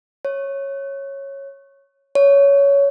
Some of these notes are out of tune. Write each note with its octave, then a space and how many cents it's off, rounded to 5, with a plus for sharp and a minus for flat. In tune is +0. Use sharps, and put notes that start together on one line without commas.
C#5 -10
C#5 +15